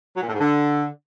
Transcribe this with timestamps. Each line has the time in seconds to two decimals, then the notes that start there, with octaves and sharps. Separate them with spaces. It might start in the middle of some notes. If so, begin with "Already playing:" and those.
0.15 F#3
0.21 A#2
0.27 A2
0.33 G#2
0.39 D3